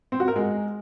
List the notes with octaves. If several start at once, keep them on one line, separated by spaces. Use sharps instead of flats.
C4
F#4
A#4
G#3